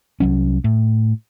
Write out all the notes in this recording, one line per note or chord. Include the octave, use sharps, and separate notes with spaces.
C2 F#3 C#4
A2